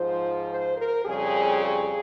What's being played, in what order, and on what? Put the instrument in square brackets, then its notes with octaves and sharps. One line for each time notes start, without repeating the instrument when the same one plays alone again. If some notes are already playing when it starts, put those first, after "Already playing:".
Already playing: [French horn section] G#2 F3 C5
C5
A#4
F2 C#3 G3 G#4
G#4